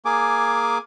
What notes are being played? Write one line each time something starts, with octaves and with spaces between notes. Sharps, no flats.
A#3 G#4 G#5 D6